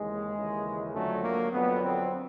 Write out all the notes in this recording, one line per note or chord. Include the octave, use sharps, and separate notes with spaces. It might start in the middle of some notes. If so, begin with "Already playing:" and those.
Already playing: D#2 C#3 E3 G#3
D#2 C#3 E3
F2 D3 F#3 A3
A#3
F2 D3 F#3 B3
C4